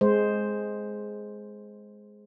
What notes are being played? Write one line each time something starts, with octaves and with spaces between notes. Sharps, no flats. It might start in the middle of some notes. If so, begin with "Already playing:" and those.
G#3 C5